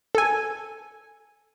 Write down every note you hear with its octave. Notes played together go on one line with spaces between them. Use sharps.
A4 G#5